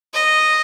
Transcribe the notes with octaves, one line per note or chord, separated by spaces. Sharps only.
D#5